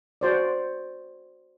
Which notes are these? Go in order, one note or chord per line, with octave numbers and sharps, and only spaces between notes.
F#4 C5 D5